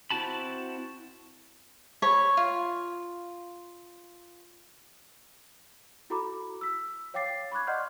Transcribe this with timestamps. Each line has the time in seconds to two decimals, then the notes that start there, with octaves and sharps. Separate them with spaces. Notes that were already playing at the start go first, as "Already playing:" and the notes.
0.10 C4 E4 F#4 A5 B5
2.02 C#5 B5
2.37 F4
6.10 E4 F#4 A4 A#5 B5 D6
6.61 E6 B6
7.14 C#5 F5 G5 D6 A6 C7
7.52 B5 C#6 D6 F#6 G#6
7.67 D5 D#5 F#5 C6 F6 G6